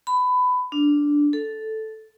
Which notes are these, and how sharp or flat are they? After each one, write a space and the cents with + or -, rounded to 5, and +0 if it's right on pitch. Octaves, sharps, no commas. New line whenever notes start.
B5 +20
D4 -5
A4 -5